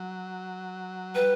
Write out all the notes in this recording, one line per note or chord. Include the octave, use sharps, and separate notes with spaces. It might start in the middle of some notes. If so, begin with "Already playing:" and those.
Already playing: F#3
G3 B4